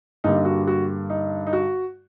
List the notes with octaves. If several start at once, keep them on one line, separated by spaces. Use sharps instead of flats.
G2 D3 G3 A#3 D#4
F#4
F#4
D#4
D#4
F#4